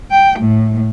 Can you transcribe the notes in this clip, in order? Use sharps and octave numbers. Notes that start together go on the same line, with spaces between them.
G5
A2